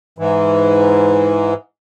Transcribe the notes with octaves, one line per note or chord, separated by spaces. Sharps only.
G#2 E3